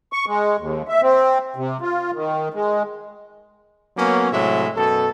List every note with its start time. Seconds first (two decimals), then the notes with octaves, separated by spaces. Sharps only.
0.13 C#6
0.27 G#3
0.58 D#2
0.88 E5
1.02 C4
1.56 C3
1.81 F4
2.13 D#3
2.54 G#3
3.97 F#3 A#3 B3 C#4
4.32 A2 C3 F#3 G#3 E5
4.76 F#2 B2 A4